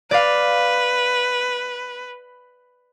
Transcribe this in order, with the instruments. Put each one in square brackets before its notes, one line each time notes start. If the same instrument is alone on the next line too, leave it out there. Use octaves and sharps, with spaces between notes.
[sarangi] B4 [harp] D5 F5